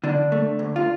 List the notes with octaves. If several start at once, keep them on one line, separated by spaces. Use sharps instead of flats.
D3 D4
A3
D2
F4